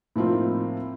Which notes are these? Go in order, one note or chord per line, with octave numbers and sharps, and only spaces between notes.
A2 F3 A#3 C4 D#4 F4